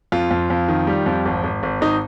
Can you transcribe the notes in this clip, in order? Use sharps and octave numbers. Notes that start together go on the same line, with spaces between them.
F2 F4
F2
F2
D#3
G3
F2
G#1
G#1
G#1
G#1 D#4